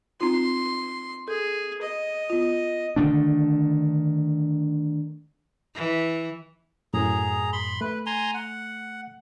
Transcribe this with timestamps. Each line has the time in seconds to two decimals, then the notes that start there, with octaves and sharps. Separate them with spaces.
0.21 C4 D#4 F4 C6
1.28 G#4 A4
1.81 D#5
2.30 B3 F4
2.96 D3 D#3 A3 D4
5.75 E3
6.94 F#2 A2 G#4 A#5
7.53 B5 C6
7.81 A3 B4
8.06 G#5 A#5 C6
8.34 F#5